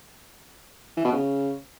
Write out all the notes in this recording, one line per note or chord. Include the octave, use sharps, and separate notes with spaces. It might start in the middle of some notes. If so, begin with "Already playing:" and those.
E3
B2
C#3